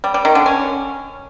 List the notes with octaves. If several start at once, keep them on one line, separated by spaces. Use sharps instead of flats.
G3
G3
D#3
D3
C#4